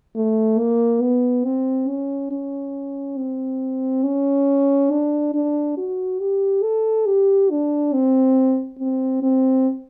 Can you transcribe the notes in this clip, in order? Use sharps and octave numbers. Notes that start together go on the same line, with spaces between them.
A3
A#3
B3
C4
C#4
C#4
C4
C#4
D4
D4
F#4
G4
A4
G4
D4
C4
C4
C4